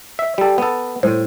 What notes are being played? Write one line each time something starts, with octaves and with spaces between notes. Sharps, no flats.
E5
G3 A4
B3 A4
A2 G3 C5